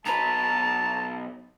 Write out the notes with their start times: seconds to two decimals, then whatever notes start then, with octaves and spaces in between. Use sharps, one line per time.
0.06 B1 B4 A5 A#5